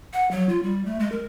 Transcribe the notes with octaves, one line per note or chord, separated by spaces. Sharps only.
F#5
F#3
F4
G3
A3
G#3
A#4